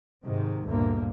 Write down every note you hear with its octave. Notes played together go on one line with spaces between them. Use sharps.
G#2 C3 D#3
G1 D2 G2 A#2 D3 A#3